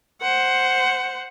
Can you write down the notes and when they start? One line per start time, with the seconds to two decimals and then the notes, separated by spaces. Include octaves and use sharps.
0.22 C5 F#5